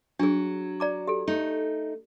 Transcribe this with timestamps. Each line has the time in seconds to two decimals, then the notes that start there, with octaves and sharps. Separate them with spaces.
0.19 F#3 D4 G#4
0.80 D5 A#5 D6
1.07 G4 A4
1.28 A3 D#4